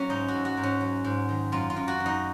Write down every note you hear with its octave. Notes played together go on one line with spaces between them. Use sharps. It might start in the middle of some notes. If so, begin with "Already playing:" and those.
Already playing: F#3 A#3 C#4
G#2 D#4
F#4
G#2
F#4
G#2
C#4
F#3
G#2
D#3
F#2 F4
F4
F#2
F#4
F#2
D#4